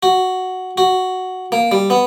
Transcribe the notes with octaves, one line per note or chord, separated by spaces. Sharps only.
F#4
F#4
A#3
G3
B3